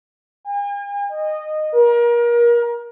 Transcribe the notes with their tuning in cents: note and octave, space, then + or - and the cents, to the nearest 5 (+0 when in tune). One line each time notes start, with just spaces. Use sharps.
G#5 -45
D#5 -15
A#4 +30